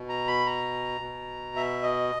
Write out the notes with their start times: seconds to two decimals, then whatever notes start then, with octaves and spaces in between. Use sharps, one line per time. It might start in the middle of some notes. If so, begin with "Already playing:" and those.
Already playing: B2
0.09 A#5
0.28 B5
0.46 A#5
1.01 B2
1.56 E5
1.83 D#5